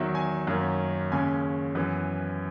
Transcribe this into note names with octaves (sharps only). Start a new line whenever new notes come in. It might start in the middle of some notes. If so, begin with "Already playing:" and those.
Already playing: E2 D#3 F#3 E5
G#5
F#2 D#3 A#3 C#4
D#2 C#3 G#3 C#4 G#5
F#2 E3 B3